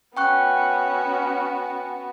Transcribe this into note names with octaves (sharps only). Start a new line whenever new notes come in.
B3 C#4 F#4 G5 C#6 F#6